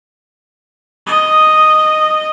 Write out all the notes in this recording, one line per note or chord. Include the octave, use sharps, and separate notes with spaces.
D#5